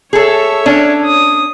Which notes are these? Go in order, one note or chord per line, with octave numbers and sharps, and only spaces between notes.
G#4 A4 C#5 E5
C#4 D4
D#6